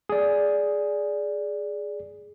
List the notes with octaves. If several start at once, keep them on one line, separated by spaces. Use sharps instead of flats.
G#4 D5